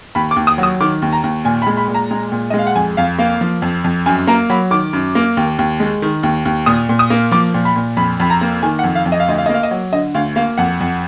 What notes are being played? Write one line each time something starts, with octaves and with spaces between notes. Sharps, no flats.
D#2 B5
D6
D#2
D#6
F#3
D#6
D#3 D6
D#2
A#5
D#2
A#2 G#5
B5
G#3
B5
A#2
A#5
G#3
A#2
G#3 D#5
F5
F#5
F2 G#5
F2 F5
A#3 F5
F3
F2
F2
F#2 G#5
A#3 A#5
F#3 B5
D#3 D6
F#2
A#3
D#2
D#2
G#3
D#3
D#2
D#2
A#2 D#6
A#2
D#6
A#3
F3 D6
A#2
B5
A#2
F2 B5
F2 B5
A#5
A#3
D#3 G#5
F#5
F2
F5
F2
D#5
F5
D2 D#5
F5
A#3 D#5
F5
D#5
F#3
D3 D#5
D2 F5
A#3 F5
F2 F#5
F2